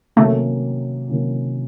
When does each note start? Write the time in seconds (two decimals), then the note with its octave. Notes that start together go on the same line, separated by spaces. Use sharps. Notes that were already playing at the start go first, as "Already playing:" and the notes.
0.16 C3 D#3 F#3 A3 A#3 C#4
1.08 C3 D#3 F#3 A#3 C#4